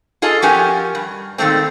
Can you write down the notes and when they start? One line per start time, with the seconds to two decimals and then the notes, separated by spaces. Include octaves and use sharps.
0.22 F4 G#4 A4 D#5
0.42 F3 C#4 F#4 G4 A#4 G#5
0.95 G2
1.38 A#2 D#3 G#3 A3 C4